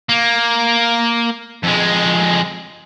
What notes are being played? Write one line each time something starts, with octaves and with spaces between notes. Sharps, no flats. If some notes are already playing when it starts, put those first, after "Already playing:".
A#3
F2 G#3